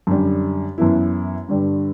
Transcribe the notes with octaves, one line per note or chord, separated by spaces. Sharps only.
F#2 D3 G3
F#2 E3 B3 E4
G2 D3 G3